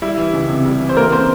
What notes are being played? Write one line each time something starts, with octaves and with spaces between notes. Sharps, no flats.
G3 E4
E3
C#2
C3
G3
E3
C5
E3 A#3 A#4
C#3 C4 C5